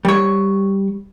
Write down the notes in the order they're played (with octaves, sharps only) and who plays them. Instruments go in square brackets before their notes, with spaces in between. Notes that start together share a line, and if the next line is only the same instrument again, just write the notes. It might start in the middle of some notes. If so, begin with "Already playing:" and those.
[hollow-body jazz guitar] G3 C#5